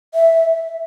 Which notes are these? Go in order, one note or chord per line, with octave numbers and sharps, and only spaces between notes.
E5